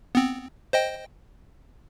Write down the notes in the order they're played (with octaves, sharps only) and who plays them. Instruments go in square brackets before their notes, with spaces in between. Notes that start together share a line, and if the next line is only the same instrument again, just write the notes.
[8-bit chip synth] B3 C4
C5 D#5 G5